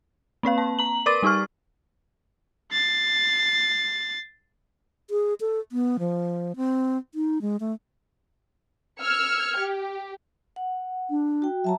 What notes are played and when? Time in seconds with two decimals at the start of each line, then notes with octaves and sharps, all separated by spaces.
0.43 A#3 C4 B4 F5
0.58 A5
0.79 A#5 F#7
1.06 A#4 B4 D5 D6 A6
1.23 G3 D#4 G4 C#6 F6
2.72 A6 C7
5.10 G#4
5.41 A4
5.72 B3
5.99 F3
6.56 C4
7.15 D#4
7.42 G#3
7.60 A3
9.01 E6 F6 G#6 C#7
9.59 G4
10.56 F#5
11.10 D4
11.42 F#4 G5
11.64 F#3 E5 A5 A#5